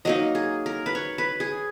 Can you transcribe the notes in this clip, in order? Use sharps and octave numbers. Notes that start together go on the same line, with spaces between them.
F#3 A#3 D#4 D#5
G#4
A#4
B4
C#5
B4
G#4